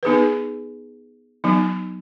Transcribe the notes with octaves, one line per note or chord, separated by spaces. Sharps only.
B3 D#4 G#4 B4
F#3 B3 D#4